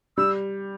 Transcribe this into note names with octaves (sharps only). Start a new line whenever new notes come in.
G3 E6